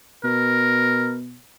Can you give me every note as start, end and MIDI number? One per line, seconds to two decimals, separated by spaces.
0.24 1.38 47
0.24 1.16 70